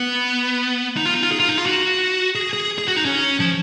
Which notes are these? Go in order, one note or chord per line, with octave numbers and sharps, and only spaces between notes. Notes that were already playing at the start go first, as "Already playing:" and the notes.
Already playing: B3
D#4
F4
D#4
F4
G#4
F4
D#4
F4
F#4
G#4
G#4
G#4
F#4
D#4
C#4
F3